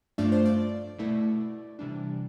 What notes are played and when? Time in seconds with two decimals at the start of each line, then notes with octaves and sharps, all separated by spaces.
0.18 G2 F3 A3 D4 F4 D5
0.32 C5
0.45 D5
0.99 B2 A3 E4
1.79 C3 E3 G3 D4